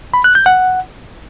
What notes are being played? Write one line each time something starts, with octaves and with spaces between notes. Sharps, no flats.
B5
F#6
G6
F#5